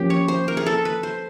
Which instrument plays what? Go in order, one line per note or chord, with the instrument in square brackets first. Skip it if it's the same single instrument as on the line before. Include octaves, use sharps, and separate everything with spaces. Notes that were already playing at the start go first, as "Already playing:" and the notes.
Already playing: [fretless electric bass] F3 A#3 C#4 [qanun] G4
[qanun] C#5
C5
A#4
G#4
A4
B4
C5